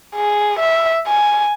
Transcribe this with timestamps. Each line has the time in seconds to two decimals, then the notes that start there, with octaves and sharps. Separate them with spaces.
0.16 G#4
0.59 E5
1.07 G#5